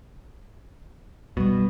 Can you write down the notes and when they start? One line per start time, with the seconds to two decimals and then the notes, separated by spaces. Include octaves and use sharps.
1.37 B2 G3 G#3